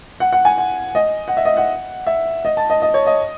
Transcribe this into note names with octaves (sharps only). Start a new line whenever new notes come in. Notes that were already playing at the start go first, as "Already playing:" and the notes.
F#5
F#5
G#5
F#5
D#5
F#5
E5
D#5
F#5
E5
D#5
A5
D#5
D#5
C#5
D#5